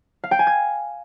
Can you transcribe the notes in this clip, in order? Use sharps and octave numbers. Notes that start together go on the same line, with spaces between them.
F5
G5
G#5
G#6